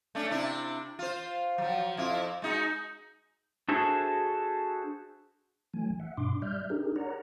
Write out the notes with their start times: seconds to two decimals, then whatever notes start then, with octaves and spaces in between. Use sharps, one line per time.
0.15 A3 C#4 D4
0.30 C3 D4 E4
0.99 F4 C5
1.58 F3 F#3
1.97 F2 E4 F4
2.42 G#3 D#4 F#4
3.68 D4 F#4 G#4 A4 C5 E5
5.74 E3 F#3 A3 G#5
6.00 E5 F#5
6.17 G2 B2 D4 C6 D6
6.42 G3 D5 E5 F6 G6
6.70 D4 D#4 G4 G#4 A#4
6.96 A#4 C#5 D5 F#5 A#5